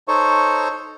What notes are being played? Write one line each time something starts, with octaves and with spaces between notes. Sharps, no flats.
D#4 A4 C5 C#5 C#6